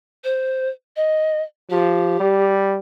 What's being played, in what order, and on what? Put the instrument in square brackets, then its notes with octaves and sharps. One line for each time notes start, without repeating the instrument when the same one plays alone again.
[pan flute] C5
D#5
[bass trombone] F3 [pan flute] G4
[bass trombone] G3